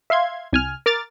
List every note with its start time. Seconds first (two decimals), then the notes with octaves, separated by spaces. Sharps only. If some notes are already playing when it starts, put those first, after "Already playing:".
0.10 E5 F5 C6 G#6
0.53 C2 G#5 F6
0.86 A#4 D6 F6 A6